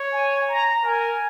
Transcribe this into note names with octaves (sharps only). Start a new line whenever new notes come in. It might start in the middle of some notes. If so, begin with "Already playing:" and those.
Already playing: C#5
G#5
A#5
A#4 G#5